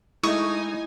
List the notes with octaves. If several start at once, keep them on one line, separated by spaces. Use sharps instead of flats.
G#3 A3 D#4 E4 G#5 C#6 D#6